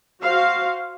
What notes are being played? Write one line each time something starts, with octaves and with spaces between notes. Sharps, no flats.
F#4 C5 F5